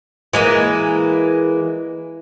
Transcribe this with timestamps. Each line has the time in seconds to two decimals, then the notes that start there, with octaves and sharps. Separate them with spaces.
0.33 E3 G#3 A#3